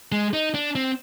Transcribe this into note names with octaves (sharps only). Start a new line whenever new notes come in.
G#3
D#4
D4
C4